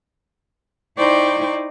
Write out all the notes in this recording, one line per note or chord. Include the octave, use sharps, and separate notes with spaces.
D#4 E4 C5 D5 G5 C#6